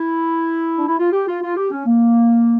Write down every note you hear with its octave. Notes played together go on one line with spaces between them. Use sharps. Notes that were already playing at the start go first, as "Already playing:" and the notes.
Already playing: E4
D4
E4
F4
G4
F4
F4
G4
C#4
A#3